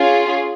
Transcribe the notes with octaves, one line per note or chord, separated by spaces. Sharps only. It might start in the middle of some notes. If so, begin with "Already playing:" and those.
Already playing: C#4 F4 G#4